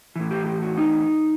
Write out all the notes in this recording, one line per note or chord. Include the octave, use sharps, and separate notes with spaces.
A2 E3
G4
G4
F#4
D#4